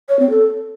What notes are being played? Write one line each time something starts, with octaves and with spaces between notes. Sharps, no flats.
C#5
C4
A4